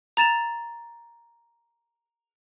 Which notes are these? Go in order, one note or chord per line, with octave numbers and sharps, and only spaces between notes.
A#5 A6 E7 F7